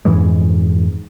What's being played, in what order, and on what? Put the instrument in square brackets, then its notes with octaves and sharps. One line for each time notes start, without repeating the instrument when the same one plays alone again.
[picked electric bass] F2 G#2 E3 G#3